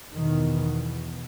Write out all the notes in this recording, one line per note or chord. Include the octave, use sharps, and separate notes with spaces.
E2 B2 D#3